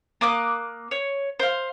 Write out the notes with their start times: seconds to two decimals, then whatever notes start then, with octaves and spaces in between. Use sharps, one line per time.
0.21 A#3 D6 D#6 F#6
0.91 C#5
1.39 C5 F5